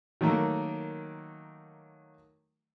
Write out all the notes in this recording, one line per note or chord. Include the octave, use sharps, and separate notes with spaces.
D#3 F#3 A3 A#3